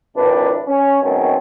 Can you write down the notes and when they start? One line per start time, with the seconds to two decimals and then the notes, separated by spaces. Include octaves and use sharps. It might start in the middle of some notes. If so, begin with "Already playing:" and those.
0.16 G#1 F2 D4 E4 B4
0.66 C#4
1.02 F#2 B2 D#3 G#3 C4 C#4